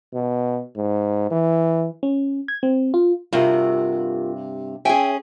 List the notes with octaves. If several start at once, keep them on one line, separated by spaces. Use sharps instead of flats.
B2
G#2
E3
C#4
G#6
C4
F4
G2 C3 F4 F#4 A#4
C#4 G#4 E5 G5 G#5